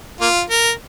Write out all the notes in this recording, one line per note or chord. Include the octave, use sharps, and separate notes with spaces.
A#3 F4
A#4